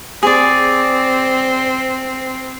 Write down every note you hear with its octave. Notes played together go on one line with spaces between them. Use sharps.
C4 G#4 D5